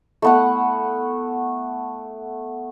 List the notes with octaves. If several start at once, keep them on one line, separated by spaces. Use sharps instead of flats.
A3 B3 F#5